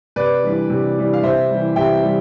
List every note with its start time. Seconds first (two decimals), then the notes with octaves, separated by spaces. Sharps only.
0.16 C3 B4 D5
0.43 E3 G3 D4
0.70 C3
0.97 E3 G3 D4
1.13 F5
1.23 C3 C5 E5
1.50 E3 G3
1.76 C3 E5 G5
2.03 E3 G3